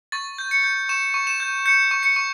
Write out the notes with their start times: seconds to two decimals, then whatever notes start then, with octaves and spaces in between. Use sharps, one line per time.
0.12 C#6 A6
0.38 G6
0.51 C#7
0.64 G6
0.89 C#6 E7
1.14 C#6
1.27 E7
1.40 G6
1.66 G6 C#7
1.91 C#6
2.03 C#7
2.16 C#6